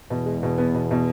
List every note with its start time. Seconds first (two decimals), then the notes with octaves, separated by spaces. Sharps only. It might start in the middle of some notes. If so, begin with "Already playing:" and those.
0.10 E2 B2
0.26 G#3
0.43 B2
0.58 B3
0.75 B2
0.91 B2